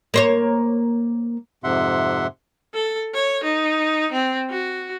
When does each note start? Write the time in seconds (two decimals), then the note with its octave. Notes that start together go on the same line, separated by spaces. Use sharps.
0.14 A#3 C5 C#5
1.64 F2 G#2 C3 E5 F#5 C6
2.74 A4
3.14 C#5
3.44 D#4
4.13 C4
4.50 F#4